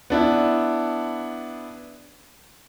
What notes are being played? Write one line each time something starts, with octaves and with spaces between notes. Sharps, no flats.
B3 D4 E4